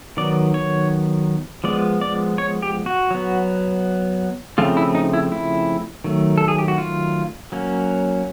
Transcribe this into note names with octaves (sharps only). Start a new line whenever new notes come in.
D#3 F#3 B3 D5
C#5
F3 G#3 B3 D5
D5
C#5
G4
F#4
F#3 B3
C#3 F3 A3 C4 F4
E4
D#4
E4
E4
D#3 F#3 A3
A4
G#4
G4
F#4
F4
F#3 A#3 C#4